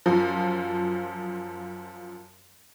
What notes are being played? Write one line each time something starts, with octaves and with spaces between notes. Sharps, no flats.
F#2 F3